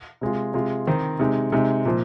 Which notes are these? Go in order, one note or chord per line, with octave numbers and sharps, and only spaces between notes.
C3 G#3 F4
C3 G#3 F4
D#3 C4 D#4
C3 G#3 D#4
C3 G#3 D#4
A#2 F3